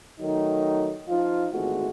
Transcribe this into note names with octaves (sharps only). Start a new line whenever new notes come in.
D#3 F#3 A3 D#4
F3 D#4 F4
G#1 E2 G#3 A3 F#4